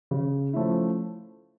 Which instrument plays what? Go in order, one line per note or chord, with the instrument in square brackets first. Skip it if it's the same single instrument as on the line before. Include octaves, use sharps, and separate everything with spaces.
[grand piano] C#3
F3 A3 C#4 E4